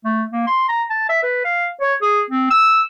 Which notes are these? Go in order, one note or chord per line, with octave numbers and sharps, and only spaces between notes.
A3
A#3
C6
A#5
A5
E5
B4
F5
C#5
G#4
C4
E6